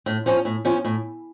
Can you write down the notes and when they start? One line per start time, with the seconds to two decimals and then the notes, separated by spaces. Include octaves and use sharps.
0.06 A2
0.26 F3 C#4 F4
0.45 A2
0.65 F3 C#4 F4
0.85 A2